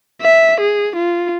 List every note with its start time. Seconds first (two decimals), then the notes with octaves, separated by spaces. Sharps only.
0.21 E5
0.60 G#4
0.96 F4